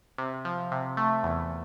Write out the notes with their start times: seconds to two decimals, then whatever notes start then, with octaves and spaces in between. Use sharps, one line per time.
0.18 C3
0.45 F3
0.72 C3
0.97 A3
1.23 E2